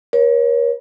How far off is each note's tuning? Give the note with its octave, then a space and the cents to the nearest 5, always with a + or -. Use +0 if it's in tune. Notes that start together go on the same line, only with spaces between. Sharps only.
A#4 +40 C#5 +0